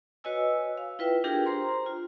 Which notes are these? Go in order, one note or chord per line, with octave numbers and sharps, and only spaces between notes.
F#4 B4 C#5 D#5 G#5 E6
F5
E4 F4 B4 E5 G5
D4 F4 G4 G#4 A#4 G5
C5 A#5 C6
F4